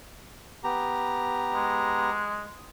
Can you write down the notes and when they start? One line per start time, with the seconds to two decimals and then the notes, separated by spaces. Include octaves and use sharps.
0.64 B3 G4 A#5
1.54 G#3